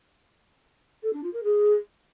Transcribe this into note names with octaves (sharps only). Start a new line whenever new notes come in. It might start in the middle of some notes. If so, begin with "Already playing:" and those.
A4
D4
F4
A#4
G#4